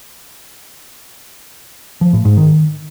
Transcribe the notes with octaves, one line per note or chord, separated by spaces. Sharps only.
F3
A2
G#2
D#3